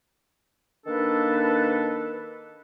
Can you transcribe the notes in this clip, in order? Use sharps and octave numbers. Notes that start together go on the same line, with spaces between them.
D#3 A#3 D4 A4 B4